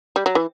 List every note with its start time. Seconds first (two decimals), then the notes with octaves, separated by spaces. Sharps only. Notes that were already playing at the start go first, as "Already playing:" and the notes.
0.16 G3
0.26 F#3
0.35 E3